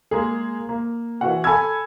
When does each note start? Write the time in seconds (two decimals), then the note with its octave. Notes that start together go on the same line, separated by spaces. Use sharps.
0.11 G#3 A#3 G#4
0.69 A#3
1.21 E3 F#4 F#5
1.44 A4 G#5 A5 B5 E6 G#6